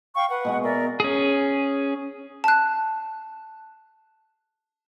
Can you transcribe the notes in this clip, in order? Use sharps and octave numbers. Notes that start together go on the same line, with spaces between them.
F5 G5 C#6
B4 F#5
B2 G#3 F#4
A#4 D5 E5
C#4 G#4
A5 F#6